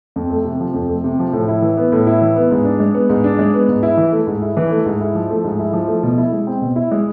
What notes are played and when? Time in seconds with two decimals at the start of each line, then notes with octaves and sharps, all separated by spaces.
0.16 F2
0.30 A3
0.45 C3
0.60 F3
0.74 F2
0.89 A3
1.04 C3
1.19 F3
1.33 A2
1.48 E4
1.62 E3
1.77 B3
1.92 A2
2.07 E4
2.21 E3
2.36 B3
2.51 G#2
2.65 D4
2.80 G#3
2.94 B3
3.09 G#2
3.24 D4
3.39 G#3
3.54 B3
3.68 G#2
3.83 E4
3.97 E3
4.13 A3
4.27 G#2
4.42 E4
4.57 E3
4.71 A3
4.86 G#2
5.00 E4
5.15 F3
5.30 A3
5.44 G#2
5.59 E4
5.73 F3
5.88 A3
6.03 B2
6.18 E4
6.33 G#3
6.47 C4
6.62 B2
6.76 E4
6.92 G#3